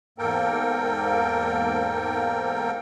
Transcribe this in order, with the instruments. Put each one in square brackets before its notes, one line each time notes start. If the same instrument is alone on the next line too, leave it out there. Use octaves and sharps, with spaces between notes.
[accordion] E2 G#2 A#3 A4 A#4 G5